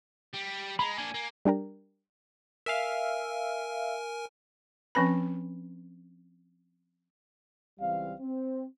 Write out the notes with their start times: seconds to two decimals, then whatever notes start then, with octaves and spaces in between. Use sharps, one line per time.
0.34 G3
0.79 G#3 A#5 B5
0.98 A#3 D4 G#5
1.14 A#3
1.45 G3 D4 G4 A#4
2.66 A#4 E5 F5 G#5
4.95 F3 C4 C#4 B4 B5
7.78 C#2 E3 G3 C4 F5
8.20 C4